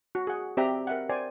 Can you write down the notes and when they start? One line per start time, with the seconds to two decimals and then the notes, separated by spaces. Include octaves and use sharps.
0.15 F#4
0.27 G#4 F#5
0.57 C4 G4 D5 E5 G5 A#5
0.87 A#4 E5 F#5
1.09 C5 D5 G5 G#5